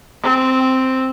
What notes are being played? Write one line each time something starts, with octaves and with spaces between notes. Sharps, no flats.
C4